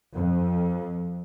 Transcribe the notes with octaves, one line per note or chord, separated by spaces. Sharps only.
F2